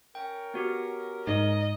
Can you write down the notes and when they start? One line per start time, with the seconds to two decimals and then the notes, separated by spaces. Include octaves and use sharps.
0.15 C#4 A#4 G5
0.54 B3 F#4 G4
1.27 G#2 D#4 D#5